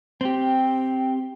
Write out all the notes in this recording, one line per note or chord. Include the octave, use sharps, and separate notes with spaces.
C4 G4 G5